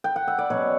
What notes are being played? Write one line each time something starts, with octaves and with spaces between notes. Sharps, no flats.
G5
F#5
E5
D5
B2 F#3 C#4 C#5